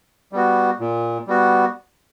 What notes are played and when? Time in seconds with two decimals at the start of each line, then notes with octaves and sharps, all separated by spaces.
0.32 G3 B3 F#4
0.80 A#2
1.27 G3 B3 F#4